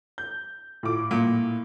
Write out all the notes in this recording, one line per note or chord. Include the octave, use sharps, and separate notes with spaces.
G6
A2 F4 D6
A#2